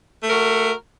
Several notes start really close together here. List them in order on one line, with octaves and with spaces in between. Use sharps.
A3 A#4 F#4